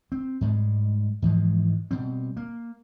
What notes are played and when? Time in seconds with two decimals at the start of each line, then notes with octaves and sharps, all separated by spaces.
0.12 C4
0.41 G#2 G3 G#3
1.22 G#2 E3 F3 G#3
1.91 B2 G3 C4
2.37 A#3